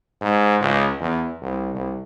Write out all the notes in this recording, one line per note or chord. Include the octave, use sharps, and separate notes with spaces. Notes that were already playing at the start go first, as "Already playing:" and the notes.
G#2
C#2
E2
C2
C2